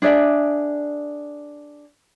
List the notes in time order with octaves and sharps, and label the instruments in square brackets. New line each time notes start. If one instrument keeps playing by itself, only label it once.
[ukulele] D4 G#4 D5 E5